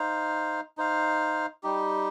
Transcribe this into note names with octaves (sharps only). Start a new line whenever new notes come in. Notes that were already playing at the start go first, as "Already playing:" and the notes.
Already playing: D#4 C5 F5
D#4 C5 F5
G3 D#4 G4